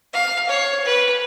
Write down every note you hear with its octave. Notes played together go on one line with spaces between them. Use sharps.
F5
C#5
B4